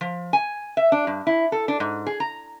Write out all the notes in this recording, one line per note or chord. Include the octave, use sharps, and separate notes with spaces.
F3
G#5
E5
D4
G2
E4
A4
D4
G#2
G#4
A#5